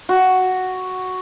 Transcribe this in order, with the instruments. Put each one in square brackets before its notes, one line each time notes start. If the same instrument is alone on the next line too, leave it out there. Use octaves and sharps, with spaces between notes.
[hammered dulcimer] F#4